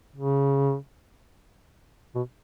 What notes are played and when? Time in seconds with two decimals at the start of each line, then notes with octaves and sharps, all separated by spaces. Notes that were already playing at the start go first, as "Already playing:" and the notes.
0.16 C#3
2.15 B2